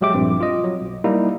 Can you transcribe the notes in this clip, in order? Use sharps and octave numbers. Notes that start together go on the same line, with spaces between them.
A#1 F#3 G#3 G4 E5 D6
A#1 G2 C4
F4 D#5
F#3
B1
G3 A#3 D#4 E4